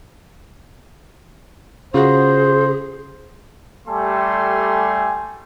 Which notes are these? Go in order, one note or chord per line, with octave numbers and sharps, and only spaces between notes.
C#3 F4 F#4 G#4 C5
G3 A3 G4 A4 G#5 C6